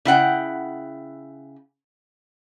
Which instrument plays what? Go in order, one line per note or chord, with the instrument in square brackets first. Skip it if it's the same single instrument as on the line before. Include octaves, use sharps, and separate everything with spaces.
[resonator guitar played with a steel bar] C#3 E4 F#5 G5